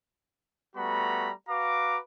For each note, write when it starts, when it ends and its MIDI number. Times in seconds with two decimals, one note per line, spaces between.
0.76 1.31 55
0.76 1.31 57
0.76 1.31 59
0.76 1.31 66
0.76 1.31 82
0.76 1.31 83
1.49 1.98 66
1.49 1.98 71
1.49 1.98 77
1.49 1.98 82
1.49 1.98 86